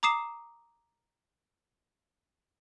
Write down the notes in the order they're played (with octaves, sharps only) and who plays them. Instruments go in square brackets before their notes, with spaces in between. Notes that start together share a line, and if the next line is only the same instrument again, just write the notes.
[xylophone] A#5 D6 D#6 C7 E7